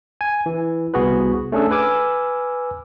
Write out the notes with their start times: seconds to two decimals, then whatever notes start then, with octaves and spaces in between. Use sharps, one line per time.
0.21 G#5
0.46 E3
0.94 C2 B3 F#4 G#4 B4
1.52 A3 C#4 D4 G#4 A4
1.71 B4 G#5 D6 E6 F6